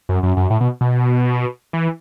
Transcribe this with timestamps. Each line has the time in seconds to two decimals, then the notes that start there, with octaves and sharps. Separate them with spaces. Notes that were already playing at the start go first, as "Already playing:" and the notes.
0.09 F#2
0.23 F#2
0.37 F#2
0.50 A2
0.61 B2
0.81 B2
1.73 E3